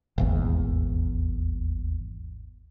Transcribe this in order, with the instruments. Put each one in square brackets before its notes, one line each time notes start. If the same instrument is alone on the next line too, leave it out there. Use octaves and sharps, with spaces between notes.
[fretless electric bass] D#1 G#1 E2